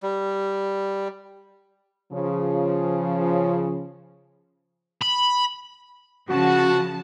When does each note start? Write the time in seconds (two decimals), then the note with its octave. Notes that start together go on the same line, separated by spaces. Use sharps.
0.03 G3
2.13 C#3 F3
5.02 B5
6.30 C#3 F3 F#4 A5